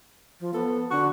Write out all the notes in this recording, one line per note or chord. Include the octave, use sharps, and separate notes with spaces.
F3
B3 A4
D3 F#4